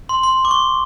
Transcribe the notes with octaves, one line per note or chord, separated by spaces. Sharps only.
C6
C6
D6
C#6